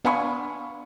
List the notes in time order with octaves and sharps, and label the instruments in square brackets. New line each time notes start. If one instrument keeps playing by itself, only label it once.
[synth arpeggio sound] B3 D4 G#5 [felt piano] F5 B5 C#6